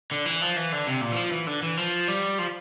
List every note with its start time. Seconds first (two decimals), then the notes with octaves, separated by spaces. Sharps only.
0.11 D3
0.26 E3
0.42 F3
0.56 E3
0.72 D3
0.87 C3
1.01 A#2
1.12 E3
1.16 F3
1.32 E3
1.47 D3
1.62 E3
1.77 F3
2.08 G3
2.39 F3